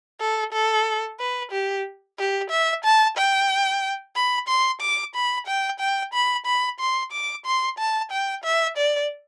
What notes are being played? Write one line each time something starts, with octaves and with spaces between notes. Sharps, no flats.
A4
A4
B4
G4
G4
E5
A5
G5
B5
C6
D6
B5
G5
G5
B5
B5
C6
D6
C6
A5
G5
E5
D5